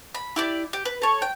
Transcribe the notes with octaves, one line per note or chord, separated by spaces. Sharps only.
B5
E4 G4 D5
G4
B4
A4 C#5
G5